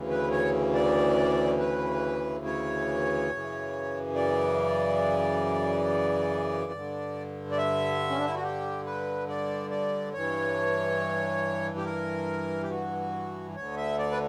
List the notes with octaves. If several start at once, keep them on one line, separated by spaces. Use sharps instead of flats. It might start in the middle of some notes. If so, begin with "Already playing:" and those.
Already playing: D2 C#3 E3
B4
C#5
D5
B4
C#5
F#2 C#3 E3
D5
G2 D3
D5
E5
C#4
D4
E4
F#4
G4
B4
D5
D5
G2 E3 C#5
G4
A#4
G4
F#4
D2 D3 C#5
E5
D5
B4